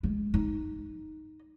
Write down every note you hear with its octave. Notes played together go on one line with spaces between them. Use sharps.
G#3 A3
D#4